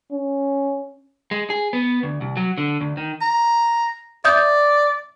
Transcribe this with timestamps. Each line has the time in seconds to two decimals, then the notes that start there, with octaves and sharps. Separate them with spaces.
0.12 C#4
1.31 G#3
1.50 G#4
1.73 B3
2.03 D2
2.21 C2
2.37 F#3
2.58 D3
2.81 D2
2.97 D#3
3.22 A#5
4.25 D5 E5 D#6 G6